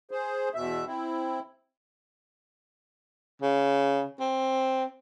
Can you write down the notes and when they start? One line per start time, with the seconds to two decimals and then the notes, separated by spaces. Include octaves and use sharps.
0.11 G#4 C5
0.55 E2 B2 E5
0.86 C4 E4
3.42 C#3
4.20 C4